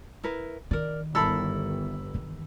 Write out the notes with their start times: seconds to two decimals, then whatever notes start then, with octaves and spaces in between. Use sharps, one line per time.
0.24 E4 A#4 B4
0.71 D#3 A#4 D5
1.15 G1 E4 A4 A#4 B5 E6
2.14 D#3 E3